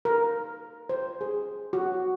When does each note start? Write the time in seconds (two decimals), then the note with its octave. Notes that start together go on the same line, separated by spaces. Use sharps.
0.05 A#4
0.89 C5
1.21 G#4
1.73 F#4